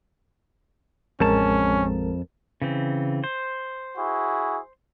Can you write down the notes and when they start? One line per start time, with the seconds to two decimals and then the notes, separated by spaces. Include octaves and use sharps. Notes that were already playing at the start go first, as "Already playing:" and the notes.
1.20 A1 F2 G#3 C#4 A#4 A5
2.62 C#3 E3 C4
3.24 C5
3.97 E4 F#4 G#4